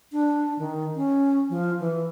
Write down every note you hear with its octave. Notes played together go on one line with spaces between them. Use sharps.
D4
D#3
C#4
F3
E3